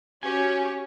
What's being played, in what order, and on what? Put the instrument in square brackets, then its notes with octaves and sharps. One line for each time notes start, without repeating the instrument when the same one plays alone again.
[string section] C#4 [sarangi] F#4 [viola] G4 C#5 [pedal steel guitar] G#5